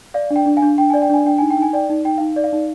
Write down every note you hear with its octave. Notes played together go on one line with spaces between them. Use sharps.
D5 F5
D4
G5
D4
F5 G#5
D4
D4 G5
D5 G#5
G5
D4 G#5
D4 G5
D#4 G#5
G5
D#4
G#5
D5 G5
D#4
D#4 G5
D#4 F5
D5
F5
D#4